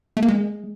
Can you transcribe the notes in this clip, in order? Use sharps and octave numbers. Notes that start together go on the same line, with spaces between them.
A3
A#3
G#3